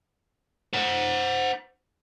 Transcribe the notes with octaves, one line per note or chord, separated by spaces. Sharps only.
C5 F#5